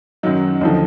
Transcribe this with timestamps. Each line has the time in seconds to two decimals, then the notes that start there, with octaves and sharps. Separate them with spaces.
0.23 F#2 D#3 F#3 D#4
0.61 D#2 D3 F3 D#4